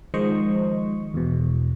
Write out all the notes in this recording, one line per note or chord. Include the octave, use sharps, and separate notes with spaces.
D#3 F3 G#3 C5 D#5 C#6
E2 B2